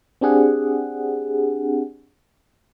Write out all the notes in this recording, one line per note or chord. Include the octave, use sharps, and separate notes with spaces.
C4 D4 G4 G#4 F#5